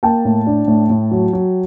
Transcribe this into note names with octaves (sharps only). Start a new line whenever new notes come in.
A#3 G5 A5
A2
D4
A2
A2
F#3
F#3